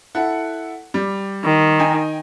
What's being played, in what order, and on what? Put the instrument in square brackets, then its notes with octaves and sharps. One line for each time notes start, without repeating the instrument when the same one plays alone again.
[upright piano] E4 A4 F#5
G3
[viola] D#3
[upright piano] D#4 G5 G#5